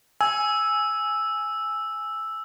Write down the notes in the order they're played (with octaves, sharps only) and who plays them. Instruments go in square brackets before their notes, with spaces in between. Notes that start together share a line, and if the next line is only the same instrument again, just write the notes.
[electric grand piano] G#5 [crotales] E6